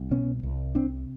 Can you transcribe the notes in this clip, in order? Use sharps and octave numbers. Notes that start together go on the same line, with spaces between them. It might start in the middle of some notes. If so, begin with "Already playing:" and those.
Already playing: C2
B2 B3 C#4
C2
C3 C4 D4